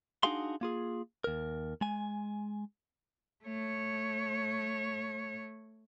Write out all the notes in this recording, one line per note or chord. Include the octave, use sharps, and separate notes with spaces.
D4 D#4 F#4 G#4 F5 C6
A#3 F4 G#4
D#2 A#4
G#3 G#5
A3 C#5